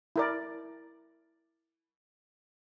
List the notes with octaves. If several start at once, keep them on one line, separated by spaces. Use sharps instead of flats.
E4 A#4 D5